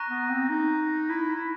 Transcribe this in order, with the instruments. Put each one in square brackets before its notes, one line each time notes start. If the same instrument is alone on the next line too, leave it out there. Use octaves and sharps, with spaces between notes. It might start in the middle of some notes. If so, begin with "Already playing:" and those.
Already playing: [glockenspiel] A#5 C#6 F#6 A#6 D#7
[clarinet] B3
C4
D#4
E4
E4